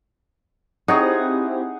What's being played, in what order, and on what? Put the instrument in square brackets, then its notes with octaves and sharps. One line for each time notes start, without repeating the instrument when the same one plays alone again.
[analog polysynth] C4 E4 G4 [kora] D#4 [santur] G#4 C#5 F#5